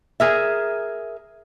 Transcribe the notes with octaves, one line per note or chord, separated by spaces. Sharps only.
G#4 A#4 E5